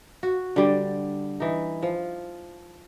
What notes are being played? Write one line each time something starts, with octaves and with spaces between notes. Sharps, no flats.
F#4
D3 G3
E3 D#4
F3